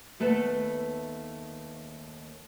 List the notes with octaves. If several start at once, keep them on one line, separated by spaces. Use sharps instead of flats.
D#2 A3 B3 B4 A5